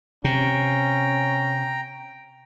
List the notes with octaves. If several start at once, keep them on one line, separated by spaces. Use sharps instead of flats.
C3 C#4 G5 A#5